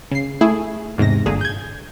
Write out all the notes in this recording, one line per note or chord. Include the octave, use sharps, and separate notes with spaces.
C#3 C7
A3 E4 G#4
E2 G#2 C3 A#6
G1 A#2 D3 G#4
G6 G#6